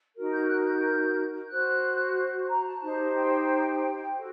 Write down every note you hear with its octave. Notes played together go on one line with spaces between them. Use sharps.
D#4 F#4 A#4
G6
F#6
G6
F#4 C5 F#6
A#5
A5
D#4 G4 C5
G5
F#4 A4